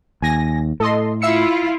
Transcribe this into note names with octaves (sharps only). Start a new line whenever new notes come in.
D#2 G#5 A#6
A2 A4 D#5 C6
E4 F4 E5 E6 C#7